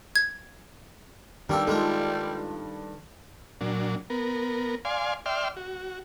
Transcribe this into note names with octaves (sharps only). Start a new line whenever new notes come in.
G#6
G2 D#3 G3 A#3 G4 A4
G#3 A#3 F4 A4
A#2 F#3 D4
B3 A#4
D5 F5 G#5 C6
D5 E5 G5 C6 F6
F#4